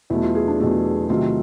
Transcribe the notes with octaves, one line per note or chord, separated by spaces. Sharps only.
E2 B2 F#3 A3 E4
F4
G#4
D4
E2 B2 F#3 A3
C3 D#3 F#3 A3 F4